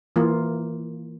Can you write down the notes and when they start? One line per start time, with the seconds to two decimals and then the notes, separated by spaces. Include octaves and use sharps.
0.16 E3 A#3 F4